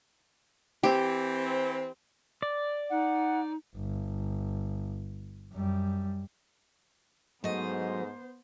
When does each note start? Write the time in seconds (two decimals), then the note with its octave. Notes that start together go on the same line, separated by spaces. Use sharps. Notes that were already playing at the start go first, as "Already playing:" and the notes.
0.83 E3 C4 G4
2.42 D5
2.90 D#4 F#5
3.76 G1
5.53 F#2 G3
7.44 G#2 F#3 A3 B3 C5 D#5